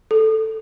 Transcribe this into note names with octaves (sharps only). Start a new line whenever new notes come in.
A4